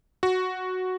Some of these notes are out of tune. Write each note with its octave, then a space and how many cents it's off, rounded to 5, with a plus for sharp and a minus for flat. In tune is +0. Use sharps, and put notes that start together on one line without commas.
F#4 +0